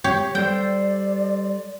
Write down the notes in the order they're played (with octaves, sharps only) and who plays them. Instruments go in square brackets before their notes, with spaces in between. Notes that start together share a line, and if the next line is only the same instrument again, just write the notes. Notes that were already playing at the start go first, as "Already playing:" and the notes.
[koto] G4 C#5
[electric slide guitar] G3 A4 C5 [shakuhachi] D5 [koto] G5